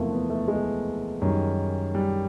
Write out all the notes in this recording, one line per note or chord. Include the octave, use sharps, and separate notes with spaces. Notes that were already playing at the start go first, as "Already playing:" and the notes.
Already playing: E2 C3 F3 A3 A#3
B3
A3
G#3
F#2 D#3 G3
G3